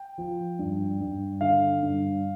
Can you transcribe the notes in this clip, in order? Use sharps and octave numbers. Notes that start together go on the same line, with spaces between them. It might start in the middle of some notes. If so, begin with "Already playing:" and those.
Already playing: G5
F3
G2
G2
D3 F5
G2